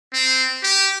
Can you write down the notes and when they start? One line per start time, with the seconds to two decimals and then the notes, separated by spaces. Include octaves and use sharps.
0.13 C4
0.63 G4